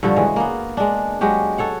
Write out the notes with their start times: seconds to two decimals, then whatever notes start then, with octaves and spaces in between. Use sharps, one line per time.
0.03 G2 D3 F3 F#4
0.16 C#3 E3 G#3
0.36 A#3 B3
0.77 G#3 D4
1.21 F#3 G#3 F#4 G4
1.58 A4 C#5 F#5